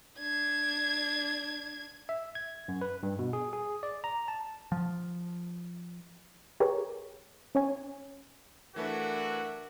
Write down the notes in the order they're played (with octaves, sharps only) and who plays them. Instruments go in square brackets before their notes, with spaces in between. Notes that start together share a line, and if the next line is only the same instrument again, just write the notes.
[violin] D4 G#6
[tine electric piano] E5
G#6
F#2
B4
G2
B2
G#4
G#4
D5
A#5
A5
[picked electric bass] F3
[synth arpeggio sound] G4 G#4 A#4 B4 C#5
C#4 C#5 G#5
[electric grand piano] E3 A3 B4 [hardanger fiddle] D4 E5 [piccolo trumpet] F#4 [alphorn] A#4